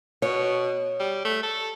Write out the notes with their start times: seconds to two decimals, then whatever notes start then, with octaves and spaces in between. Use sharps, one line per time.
0.22 B2 C#5
1.00 G3
1.25 A3
1.43 A4